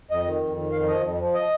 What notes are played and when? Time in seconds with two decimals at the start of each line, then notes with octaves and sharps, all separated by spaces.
0.10 F2 D#5
0.26 D#3
0.41 F2
0.56 D#3
0.72 F2 F5
0.88 F3 D#5
1.03 F2
1.19 F3
1.34 D#5